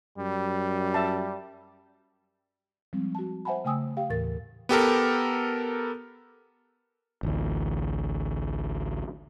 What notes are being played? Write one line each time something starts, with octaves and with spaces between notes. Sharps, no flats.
F#2 G3
E5 A5
F3 G3 G#3 C4
F#4 A5
C5 E5 F#5 G#5 A5 B5
C#3 A3 G5 G#5 D#6 E6
G4 F5 G5
D#2 A2 E3 A#4 A6
B3 G4 A4 A#4
A1 D2